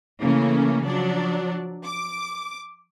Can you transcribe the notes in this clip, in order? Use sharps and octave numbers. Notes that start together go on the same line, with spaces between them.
C#3 E3 A3 A#3 C#4
F3 F#3 D4 D5
D6